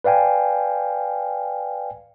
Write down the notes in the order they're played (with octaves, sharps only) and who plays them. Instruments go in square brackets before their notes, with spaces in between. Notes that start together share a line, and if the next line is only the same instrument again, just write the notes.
[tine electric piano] B4 D5 F5 G5 G#5